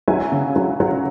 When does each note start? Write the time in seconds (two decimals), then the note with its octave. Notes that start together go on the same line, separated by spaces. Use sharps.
0.08 F#3 E5 G#5
0.32 C#3
0.56 F#3
0.80 F#3